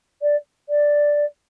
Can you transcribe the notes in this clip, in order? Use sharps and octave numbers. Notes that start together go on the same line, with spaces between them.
D5
D5